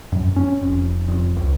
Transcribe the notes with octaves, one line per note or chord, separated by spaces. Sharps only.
F#2
C#4
F1
F1
C#2